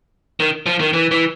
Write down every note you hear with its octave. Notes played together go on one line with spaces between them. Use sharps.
D#3
F3
D#3
E3
E3